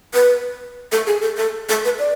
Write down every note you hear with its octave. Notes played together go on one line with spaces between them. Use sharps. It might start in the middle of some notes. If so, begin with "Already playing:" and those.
B4
A4
G#4
A4
A4
A4
B4
D5